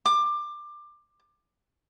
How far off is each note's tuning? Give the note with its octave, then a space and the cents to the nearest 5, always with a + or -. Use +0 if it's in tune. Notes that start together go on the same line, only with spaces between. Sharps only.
D6 +20